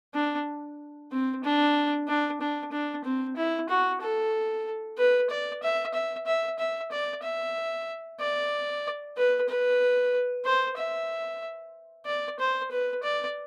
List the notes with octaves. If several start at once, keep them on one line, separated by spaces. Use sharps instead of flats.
D4
C4
D4
D4
D4
D4
C4
E4
F#4
A4
B4
D5
E5
E5
E5
E5
D5
E5
D5
B4
B4
C5
E5
D5
C5
B4
D5